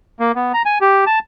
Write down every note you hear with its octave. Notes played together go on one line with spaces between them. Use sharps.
A#3
B3
A#5
G#5
G4
A5